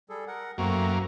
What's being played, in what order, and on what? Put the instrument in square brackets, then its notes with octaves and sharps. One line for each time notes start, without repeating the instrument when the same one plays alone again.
[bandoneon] G3 G#4 A4
A#4 F#5
[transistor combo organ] F#2 A#3 [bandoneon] A3 C4 F#4